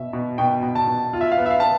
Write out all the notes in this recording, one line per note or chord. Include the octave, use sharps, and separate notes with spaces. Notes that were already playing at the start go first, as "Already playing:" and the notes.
Already playing: B2 E5
B2
B2 G5
B2
A5
B2
F4
E5
F5
B3
E5
F5
B3 A5